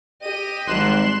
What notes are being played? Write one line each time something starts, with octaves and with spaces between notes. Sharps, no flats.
G4 D#5 D#7
G#1 G3 G#3 C6 F#6 E7